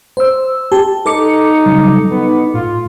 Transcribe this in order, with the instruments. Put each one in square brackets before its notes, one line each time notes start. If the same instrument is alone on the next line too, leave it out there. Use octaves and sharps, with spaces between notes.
[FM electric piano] C5 E6
G4 A5
[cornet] D#4 [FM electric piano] A4 D6 C#7
[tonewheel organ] C#3 F#3 G3
[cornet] B3 [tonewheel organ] D#4
[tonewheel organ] A2 [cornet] F4